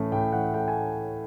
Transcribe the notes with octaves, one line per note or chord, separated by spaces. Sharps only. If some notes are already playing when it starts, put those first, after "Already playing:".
Already playing: A2 E3 A3 C#4
A2 G5
E3 F#5
A3 G5
G#5